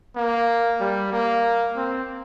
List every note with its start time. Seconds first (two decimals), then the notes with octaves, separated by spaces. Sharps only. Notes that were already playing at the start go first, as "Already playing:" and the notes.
0.16 A#3
0.80 G3
1.12 A#3
1.76 C4